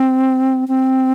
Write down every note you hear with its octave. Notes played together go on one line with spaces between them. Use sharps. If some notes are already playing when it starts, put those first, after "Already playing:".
Already playing: C4
C4